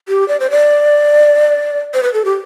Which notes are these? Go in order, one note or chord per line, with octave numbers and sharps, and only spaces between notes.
G4
D5
C5
D5
C5
B4
A4
G4